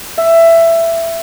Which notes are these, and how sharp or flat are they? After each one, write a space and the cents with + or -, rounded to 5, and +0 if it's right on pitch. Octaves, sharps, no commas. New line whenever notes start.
E5 +15